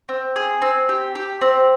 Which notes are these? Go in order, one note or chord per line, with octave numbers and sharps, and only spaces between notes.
C4
G#4
C4
G4
G4
C4